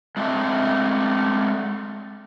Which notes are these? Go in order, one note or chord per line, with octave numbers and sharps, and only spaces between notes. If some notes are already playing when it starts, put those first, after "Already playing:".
G#3 A3 C4 D4 E5